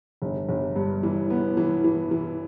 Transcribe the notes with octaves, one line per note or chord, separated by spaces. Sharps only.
G1
G1
G2
E3
B3
E3
E3
E3